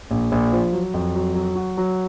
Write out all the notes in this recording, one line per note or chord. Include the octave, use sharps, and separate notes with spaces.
A#1
A#1
F3
F#3
F2
F#3
F#3
F#4
F#3